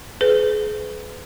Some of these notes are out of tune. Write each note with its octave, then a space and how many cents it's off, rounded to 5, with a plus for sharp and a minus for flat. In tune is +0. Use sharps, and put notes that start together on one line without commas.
G#4 +35 B4 +30